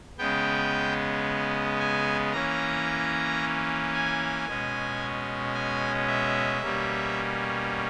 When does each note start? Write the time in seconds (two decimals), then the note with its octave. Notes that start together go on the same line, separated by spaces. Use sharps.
0.18 C#3 G#3 B3 G5
1.79 G#5
2.32 E3 A#3 C#4 A#5
3.94 G#5
4.47 B2 G#3 C#4
5.54 G#5
6.07 E5
6.61 B2 G3 A#3 C#4